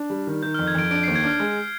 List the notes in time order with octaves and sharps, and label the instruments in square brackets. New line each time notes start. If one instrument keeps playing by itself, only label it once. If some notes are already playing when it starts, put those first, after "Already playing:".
Already playing: [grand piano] D4
G3
D#3
[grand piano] D#3 [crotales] G6
[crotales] F6
[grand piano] F2
[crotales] G#6
[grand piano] F2 [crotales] D7
[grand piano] D4 [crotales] D7
[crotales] C7
[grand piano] D#2
[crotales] G#6
[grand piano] D4 [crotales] F6
[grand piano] G#3 [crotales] F6